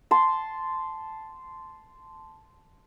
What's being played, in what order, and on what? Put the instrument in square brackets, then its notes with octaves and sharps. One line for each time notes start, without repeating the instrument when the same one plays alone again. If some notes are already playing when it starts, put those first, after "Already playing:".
[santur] A5 C6